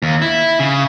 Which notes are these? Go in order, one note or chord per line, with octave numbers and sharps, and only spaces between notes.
D#2
E4
C#3